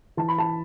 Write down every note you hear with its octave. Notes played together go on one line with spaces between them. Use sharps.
E3 A5
B5
A5